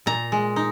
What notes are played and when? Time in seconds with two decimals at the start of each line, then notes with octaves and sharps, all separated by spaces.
0.06 A#2 A#5
0.32 G#3
0.56 D#4